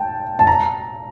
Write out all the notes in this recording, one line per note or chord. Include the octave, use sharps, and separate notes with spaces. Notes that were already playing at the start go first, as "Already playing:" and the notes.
Already playing: G5 A5
A5
A#5